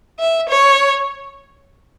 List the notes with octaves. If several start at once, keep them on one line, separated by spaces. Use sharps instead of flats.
E5
C#5